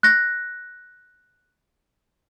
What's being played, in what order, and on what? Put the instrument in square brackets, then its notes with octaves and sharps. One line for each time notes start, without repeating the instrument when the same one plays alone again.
[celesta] F#6 A#6